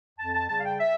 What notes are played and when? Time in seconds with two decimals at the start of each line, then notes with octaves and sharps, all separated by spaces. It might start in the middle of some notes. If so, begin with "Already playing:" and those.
0.19 F2 A5
0.34 A5
0.49 C#3 G3 A5
0.59 F5
0.64 G5
0.79 E5